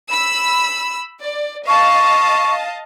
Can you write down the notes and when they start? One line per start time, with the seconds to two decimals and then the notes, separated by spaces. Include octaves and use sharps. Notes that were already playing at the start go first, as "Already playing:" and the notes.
0.11 B5 E6
1.20 D5
1.68 D#5 F5 A5 C#6